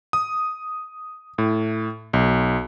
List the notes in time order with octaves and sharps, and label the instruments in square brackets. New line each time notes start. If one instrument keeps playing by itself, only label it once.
[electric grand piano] D#6
A2
B1